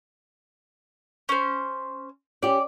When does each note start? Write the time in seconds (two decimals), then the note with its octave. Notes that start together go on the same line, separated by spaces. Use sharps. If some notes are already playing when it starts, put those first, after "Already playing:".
1.29 C#4 C5
2.43 C#4 G4 D5